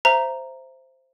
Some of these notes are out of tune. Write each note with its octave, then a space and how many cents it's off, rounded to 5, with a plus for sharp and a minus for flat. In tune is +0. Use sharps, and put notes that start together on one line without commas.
C5 +0 E5 +25 A#5 +0